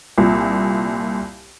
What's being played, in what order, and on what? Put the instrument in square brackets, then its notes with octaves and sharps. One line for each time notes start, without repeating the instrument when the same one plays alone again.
[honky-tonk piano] C2 A#2